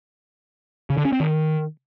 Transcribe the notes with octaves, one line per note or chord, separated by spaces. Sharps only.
C#3
D3
C#4
C4
D#3